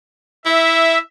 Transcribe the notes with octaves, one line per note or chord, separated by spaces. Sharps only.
E4 E5